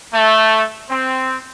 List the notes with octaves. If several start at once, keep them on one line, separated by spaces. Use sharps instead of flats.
A3
C4